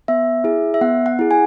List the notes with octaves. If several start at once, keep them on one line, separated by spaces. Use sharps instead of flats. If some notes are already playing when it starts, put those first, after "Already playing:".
B3 E5
E4 G#4
E5
B3 F#5
F#5
E4 G#4
G#5